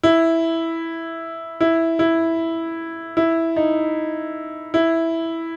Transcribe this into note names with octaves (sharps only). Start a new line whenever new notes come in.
E4
E4
E4
E4
D#4
E4